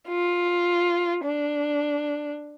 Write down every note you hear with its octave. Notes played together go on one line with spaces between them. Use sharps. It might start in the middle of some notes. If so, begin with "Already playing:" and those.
F4
D4